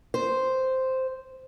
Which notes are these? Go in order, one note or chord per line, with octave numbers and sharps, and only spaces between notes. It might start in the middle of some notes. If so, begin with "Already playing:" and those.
C5